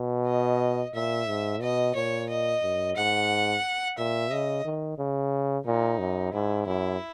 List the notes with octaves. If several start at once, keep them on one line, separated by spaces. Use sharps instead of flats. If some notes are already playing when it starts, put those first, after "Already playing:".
Already playing: B2
D#5
A#2 E5
G#2
B2 D#5
A#2 C#5
D#5
F#2
G#2 F#5
A#2 E5
C#3 D#5
D#3
C#3
A#2 D#4
F#2
G#2 E4
F#2 E4